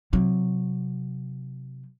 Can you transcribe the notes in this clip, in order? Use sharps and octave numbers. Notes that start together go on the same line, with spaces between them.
C3 F#3